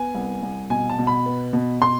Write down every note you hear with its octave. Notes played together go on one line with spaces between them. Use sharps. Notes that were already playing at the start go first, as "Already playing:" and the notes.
Already playing: B3 G#5
C2
C2
B2 G#5
A5
B2
B5
B3
B2
B2 C6